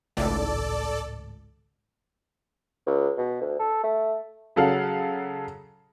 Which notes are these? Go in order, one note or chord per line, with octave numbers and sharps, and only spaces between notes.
G#1 C#2 A2 A4 D5
C#2
B2
D2
A4
A3
C#3 F#3 A4 F5 F#5